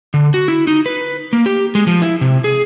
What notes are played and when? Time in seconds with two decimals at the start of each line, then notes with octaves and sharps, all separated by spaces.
0.14 D3
0.34 F#4
0.48 E4
0.67 D#4
0.86 B4
1.33 A#3
1.46 G4
1.75 G#3
1.87 F3
2.02 E4
2.21 C3
2.44 G#4